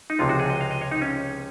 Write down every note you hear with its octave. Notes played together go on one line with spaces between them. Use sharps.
D#4
C#2 C3 F3 G#3 F4
F#4
G#4
D#5
F5
D#5
C#5
D#4
C#4